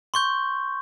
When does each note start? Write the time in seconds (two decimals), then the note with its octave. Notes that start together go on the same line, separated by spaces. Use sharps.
0.14 C6 C#6 G6